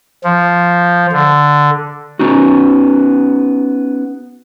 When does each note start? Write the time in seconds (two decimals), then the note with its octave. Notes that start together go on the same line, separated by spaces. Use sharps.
0.24 F3
1.12 D3
2.19 B3 C#4 D#4 F#4